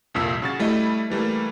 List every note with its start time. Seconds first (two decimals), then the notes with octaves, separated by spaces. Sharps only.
0.14 C2 F2 A#2 E6 B6
0.42 C#3 F#4 A6
0.59 G3 A3 E4 D#5
1.10 E3 G3 A3 A#3